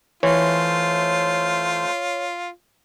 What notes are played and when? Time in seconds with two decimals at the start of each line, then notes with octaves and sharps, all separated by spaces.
0.23 E3 A3 F4 C5 C#5